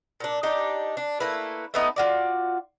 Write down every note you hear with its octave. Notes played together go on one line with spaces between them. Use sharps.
A#2 D4
D4 D#4 G4
D4
A3 A#3 E4 B4
A3 B3 D#4
F4 F#4 D5